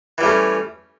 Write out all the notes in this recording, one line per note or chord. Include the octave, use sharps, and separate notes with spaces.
E3 G3 A3 C#4